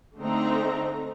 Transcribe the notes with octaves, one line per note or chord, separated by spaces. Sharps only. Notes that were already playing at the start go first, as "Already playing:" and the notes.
D3 A3 C4 D#4 A#5